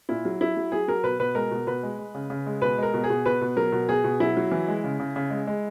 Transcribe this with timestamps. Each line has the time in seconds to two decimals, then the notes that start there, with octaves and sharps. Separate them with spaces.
0.09 A#2 E4
0.25 F#3
0.41 F#3 E4
0.57 F#3
0.72 F#3 G#4
0.88 F#3 A#4
1.04 B2 B4
1.20 B2 B4
1.35 G#3 A#4
1.51 B2
1.67 B2 B4
1.83 G#3
1.99 G#3
2.15 C#3
2.30 C#3
2.46 G#3
2.62 B2 B4
2.78 G#3 A#4
2.94 B2
3.04 G#4
3.10 B2
3.26 B2 B4
3.41 B2
3.57 F#3 A#4
3.72 B2
3.89 B2 G#4
4.04 B2
4.20 F#3 E4
4.37 F#3
4.52 E3
4.68 G#3
4.84 C#3
5.00 C#3
5.16 C#3
5.31 G#3
5.47 G#3